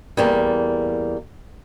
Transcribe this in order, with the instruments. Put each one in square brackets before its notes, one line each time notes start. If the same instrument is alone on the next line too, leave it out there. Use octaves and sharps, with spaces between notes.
[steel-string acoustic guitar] E2 G3 A#3